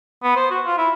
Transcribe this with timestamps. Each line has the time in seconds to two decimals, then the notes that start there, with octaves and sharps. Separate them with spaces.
0.23 B3
0.36 C5
0.51 F#4
0.66 F4
0.78 E4